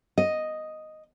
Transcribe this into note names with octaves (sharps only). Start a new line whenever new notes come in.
D#5